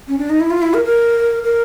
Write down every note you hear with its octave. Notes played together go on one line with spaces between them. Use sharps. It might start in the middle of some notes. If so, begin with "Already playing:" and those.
C#4
D4
D#4
E4
F4
E4
A#4
A#4
A#4